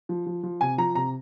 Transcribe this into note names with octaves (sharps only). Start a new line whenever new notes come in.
F3
F3
F3
C3 G#5
F3 A#5
C3 A#5